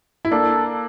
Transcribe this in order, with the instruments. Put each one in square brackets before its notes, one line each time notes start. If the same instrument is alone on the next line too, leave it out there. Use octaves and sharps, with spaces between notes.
[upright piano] E4
[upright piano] A#3 D4 [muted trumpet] A4